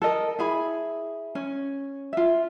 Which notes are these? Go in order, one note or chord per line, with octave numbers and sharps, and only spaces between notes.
A4 A#4 D#5
E4 G#4 B5
C#4
F4 E5